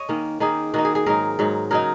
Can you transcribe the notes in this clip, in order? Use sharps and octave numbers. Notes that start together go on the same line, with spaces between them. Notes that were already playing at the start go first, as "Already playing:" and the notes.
Already playing: C#5 D#5
D#3 A#3 C#4
D#3 A#3 D#4 G#4
D#3 A#3 D#4 F#4
G#4
G#4
G#2 F#3 D#4 A#4
G#2 F#3 D#4
C#3 F#3 D#4 A#4